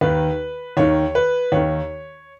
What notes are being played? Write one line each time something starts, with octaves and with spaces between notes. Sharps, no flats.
D#2 D#3 B4
D#2 D#3 C#5
B4
D#2 D#3 C#5